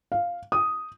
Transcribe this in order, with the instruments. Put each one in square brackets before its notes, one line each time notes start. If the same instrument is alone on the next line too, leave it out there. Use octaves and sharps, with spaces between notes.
[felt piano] F5
D#6